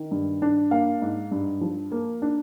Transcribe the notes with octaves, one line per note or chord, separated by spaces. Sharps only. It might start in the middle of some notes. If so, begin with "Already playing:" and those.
Already playing: D#3
G2
D4
A#3 F5
G#2
G2
F3
A#3
D4